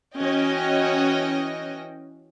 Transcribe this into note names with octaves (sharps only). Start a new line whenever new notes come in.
E3 C#4 F#4 D#5 G5